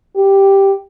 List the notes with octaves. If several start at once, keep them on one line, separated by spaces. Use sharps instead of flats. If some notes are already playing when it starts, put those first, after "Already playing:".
G4